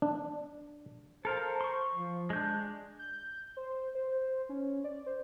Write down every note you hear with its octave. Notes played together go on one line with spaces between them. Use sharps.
D4
A4 A#4 C5 F5
C6 C#6
F3
G#3 D4 G6
G6
C5
C5
C#4
D5
C5